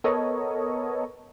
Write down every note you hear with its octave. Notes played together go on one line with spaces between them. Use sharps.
B3 A4 A#4 C#5 D#5